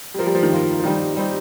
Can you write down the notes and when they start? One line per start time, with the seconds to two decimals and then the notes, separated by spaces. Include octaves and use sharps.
0.14 G3
0.18 F3 A#3 F4 A#4
0.27 G3
0.35 F3
0.43 D#3
0.52 A#3 F4 A#4
0.80 F3
0.84 D#3 G3 C4 D#4
1.16 G3 C4 D#4